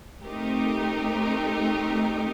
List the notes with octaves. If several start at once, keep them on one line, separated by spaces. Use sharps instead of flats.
A3 C4 D#4 G4 A#4